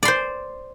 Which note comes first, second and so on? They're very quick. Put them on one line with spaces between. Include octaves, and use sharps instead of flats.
D5 C6 C5